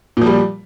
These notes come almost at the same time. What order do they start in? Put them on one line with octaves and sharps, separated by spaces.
A#2 F3 G3